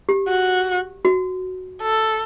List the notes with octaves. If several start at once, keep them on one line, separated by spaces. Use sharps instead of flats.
G4
F#4
F#4
A4